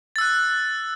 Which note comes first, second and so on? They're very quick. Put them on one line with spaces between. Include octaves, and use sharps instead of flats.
A6 E6 F#6